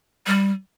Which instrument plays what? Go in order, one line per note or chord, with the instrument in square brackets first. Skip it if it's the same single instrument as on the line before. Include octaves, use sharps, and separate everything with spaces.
[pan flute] G3